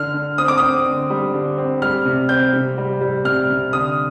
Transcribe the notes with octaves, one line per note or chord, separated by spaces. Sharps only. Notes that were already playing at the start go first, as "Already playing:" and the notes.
Already playing: D3 F6
D3
C4 D#6
D6
C4 D#6
D3
G3
D3
C4
G3 F6
C3
C4 G6
C3
G3
G3
C3 F6
C3
D3 D#6